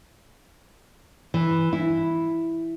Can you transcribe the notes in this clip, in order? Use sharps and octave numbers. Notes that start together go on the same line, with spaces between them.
E3
E4